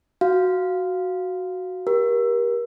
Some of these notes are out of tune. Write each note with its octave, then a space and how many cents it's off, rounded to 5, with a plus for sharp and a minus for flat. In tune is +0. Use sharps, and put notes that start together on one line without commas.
F#4 +0 F5 +0
G4 +0 A#4 +30